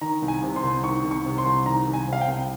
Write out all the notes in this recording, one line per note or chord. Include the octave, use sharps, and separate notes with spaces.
D#3 A#5
C2
G#5
C3
C6
C2
D#3 C#6
C2
C#6
C3
C6
C2
D#3 A#5
C2
G#5
C3
F5
G5
C2